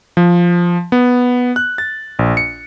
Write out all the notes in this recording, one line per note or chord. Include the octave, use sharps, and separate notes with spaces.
F3
B3
F#6
A6
A#1
C#7